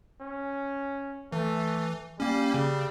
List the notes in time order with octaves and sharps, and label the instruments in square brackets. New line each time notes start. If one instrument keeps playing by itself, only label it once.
[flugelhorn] C#4
[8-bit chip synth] E3 [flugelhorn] A3
[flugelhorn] G3 [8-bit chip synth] A#3 C#4
[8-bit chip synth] C#3